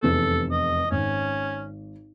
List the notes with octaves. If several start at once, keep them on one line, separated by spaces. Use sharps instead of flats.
F1 E2 C3 A4
D#5
G#1 C#4